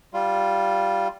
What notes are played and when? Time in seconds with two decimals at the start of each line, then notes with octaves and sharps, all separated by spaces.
0.14 G3 F4